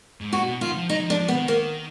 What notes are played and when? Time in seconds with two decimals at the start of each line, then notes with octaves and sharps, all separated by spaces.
0.21 G#2
0.32 A#2 F#4
0.46 B2
0.61 D#3 F4
0.76 F3
0.89 F#3 D#4
1.00 F#3
1.04 F3
1.10 D4
1.19 F3
1.28 B3
1.34 D#3
1.48 A#3